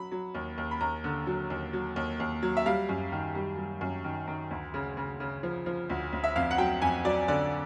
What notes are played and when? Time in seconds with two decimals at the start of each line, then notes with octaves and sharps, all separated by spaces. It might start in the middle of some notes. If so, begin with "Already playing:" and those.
Already playing: F#3 B5
0.11 F#3
0.35 D#2
0.58 D#2
0.71 B5
0.81 D#2 A#5
1.04 D3
1.27 F#3
1.50 D#2
1.73 F#3
1.96 D#2
2.20 D#2
2.43 F#3
2.57 E5
2.66 G3 F5
2.89 F#2
3.12 D#3
3.35 G3
3.58 G3
3.81 F#2
4.04 D#3
4.28 D#3
4.51 D2
4.74 C#3
4.97 C#3
5.20 C#3
5.43 F3
5.66 F3
5.89 D2
6.12 D2
6.24 E5
6.36 F2 F5
6.51 F#5
6.58 F#3 G5
6.82 F2 G#5
7.05 F#3 D5
7.28 D3 D5